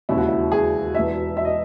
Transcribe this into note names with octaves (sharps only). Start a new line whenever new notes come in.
E1 D#2 C#3 E4
F#4
E4
G#4
E1 E2 B2 E5
E5
D#5